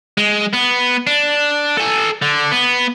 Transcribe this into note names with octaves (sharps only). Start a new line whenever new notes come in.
G#3
B3
D4
A4 G#5
D3
B3